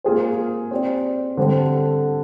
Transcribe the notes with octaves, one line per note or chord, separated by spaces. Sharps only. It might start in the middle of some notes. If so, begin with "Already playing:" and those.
A#3 F4 G#4 C5
C4 G4 D5
D3 G3 C4 G4 C5